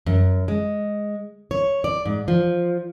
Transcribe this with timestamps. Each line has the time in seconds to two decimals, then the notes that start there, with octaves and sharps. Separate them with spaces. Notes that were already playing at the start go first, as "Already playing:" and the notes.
0.06 F#2
0.48 G#3
1.51 C#5
1.84 D5
2.06 G#2
2.28 F3